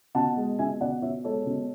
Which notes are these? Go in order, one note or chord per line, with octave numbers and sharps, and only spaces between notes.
B2 F#5 A5
G#3
B2 E5 G#5
B2 D5 F#5
B2 C#5 E5
G#3 A4 C#5
B2